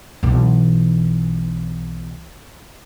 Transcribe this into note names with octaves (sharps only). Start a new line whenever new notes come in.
B1 E3